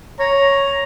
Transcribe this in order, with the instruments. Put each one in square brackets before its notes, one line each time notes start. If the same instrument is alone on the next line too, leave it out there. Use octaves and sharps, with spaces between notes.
[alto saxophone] C#5 [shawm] A#5